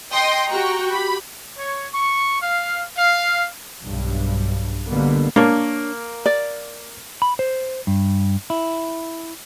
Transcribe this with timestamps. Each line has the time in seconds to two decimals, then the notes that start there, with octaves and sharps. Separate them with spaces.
0.12 D#5 G5 C6 D#6 A#6
0.48 F#4 G4 G5 A#5 C#6
0.88 G4 B5
1.56 C#5
1.93 C#6
2.41 F5
2.96 F5
3.82 B1 G2
4.86 B2 D3 G3 A#3 B3
5.36 A#3 D4 C#5
6.26 D5
7.22 B5
7.39 C5
7.87 G2
8.50 E4